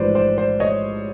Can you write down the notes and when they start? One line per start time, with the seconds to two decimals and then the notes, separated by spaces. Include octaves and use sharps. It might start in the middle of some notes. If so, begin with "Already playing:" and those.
Already playing: A1 G#2 F3 G#3 B4 C5 D5
0.15 C5 D5
0.38 C5 D5
0.60 C#5 D#5